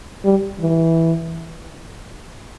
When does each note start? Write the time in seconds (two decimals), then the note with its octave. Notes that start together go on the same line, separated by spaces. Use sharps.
0.25 G3
0.60 E3